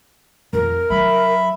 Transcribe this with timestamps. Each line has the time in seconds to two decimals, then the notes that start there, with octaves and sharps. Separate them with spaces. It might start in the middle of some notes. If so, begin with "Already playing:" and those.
0.53 F2 A#4
0.90 F#3 E5 B5